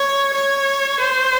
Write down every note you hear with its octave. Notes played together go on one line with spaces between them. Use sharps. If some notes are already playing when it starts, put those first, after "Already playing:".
Already playing: C#5
C#5
C5